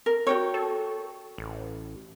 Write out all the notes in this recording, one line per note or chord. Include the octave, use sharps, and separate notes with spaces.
A#4
F#4 G4 C#5
A4
A1